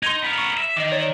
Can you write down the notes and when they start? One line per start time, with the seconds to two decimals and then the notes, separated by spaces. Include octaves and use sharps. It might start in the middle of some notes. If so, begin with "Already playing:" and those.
0.03 D#4 C6 G#6
0.22 B3 A#4
0.38 C#6
0.57 E5
0.76 D#3 D#5 D6
0.92 C#5 D5